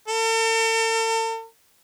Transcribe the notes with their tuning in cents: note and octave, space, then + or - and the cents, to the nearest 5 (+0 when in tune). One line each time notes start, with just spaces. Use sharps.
A4 +45